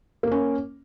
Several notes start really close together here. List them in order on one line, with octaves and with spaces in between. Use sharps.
A#3 A#4 C#4